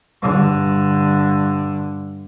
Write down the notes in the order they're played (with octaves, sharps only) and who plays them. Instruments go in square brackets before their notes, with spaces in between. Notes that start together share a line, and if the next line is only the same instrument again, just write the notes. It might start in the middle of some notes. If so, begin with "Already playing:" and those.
[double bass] G2 D3